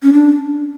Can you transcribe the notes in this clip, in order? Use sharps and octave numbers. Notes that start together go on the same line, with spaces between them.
C#4
D4